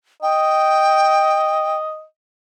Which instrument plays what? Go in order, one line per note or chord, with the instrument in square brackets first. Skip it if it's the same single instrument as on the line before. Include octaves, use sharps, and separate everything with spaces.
[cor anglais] D#5 [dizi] G5